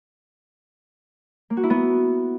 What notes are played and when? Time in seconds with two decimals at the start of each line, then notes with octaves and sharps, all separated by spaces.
1.50 A#3
1.57 F#4
1.63 E4
1.70 B3